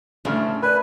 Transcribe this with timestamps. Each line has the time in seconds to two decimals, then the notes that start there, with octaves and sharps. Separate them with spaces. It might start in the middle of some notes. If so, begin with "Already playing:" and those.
0.25 A1 C#3 A3 D4 E5 F6
0.63 A#4 B4 D5 G#5